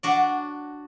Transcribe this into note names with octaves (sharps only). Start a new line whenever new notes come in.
D4 F#4 D5